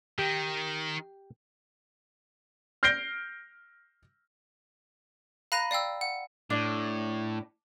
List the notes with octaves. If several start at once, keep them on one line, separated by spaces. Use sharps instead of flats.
D#3 G4
F6 G6 A#6 C7 D7 G7
F5 A#5 B5 F#6 A#6 D#7
D5 F5 G5 E6
F#5
A2 D4